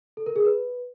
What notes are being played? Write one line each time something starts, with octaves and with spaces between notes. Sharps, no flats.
A4
A#4
G#4
B4